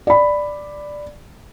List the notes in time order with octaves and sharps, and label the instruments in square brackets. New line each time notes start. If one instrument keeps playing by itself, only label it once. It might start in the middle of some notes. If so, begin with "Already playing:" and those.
[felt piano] D5 B5